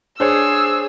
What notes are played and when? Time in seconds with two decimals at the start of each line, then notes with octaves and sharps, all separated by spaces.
0.20 D4 G#4 C5 C#5 E6